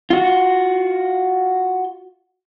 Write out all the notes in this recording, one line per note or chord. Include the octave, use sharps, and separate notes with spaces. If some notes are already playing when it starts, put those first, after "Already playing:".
F4 F#4